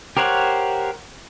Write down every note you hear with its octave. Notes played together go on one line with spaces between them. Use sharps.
G4 A#4 C5 C#5 F#5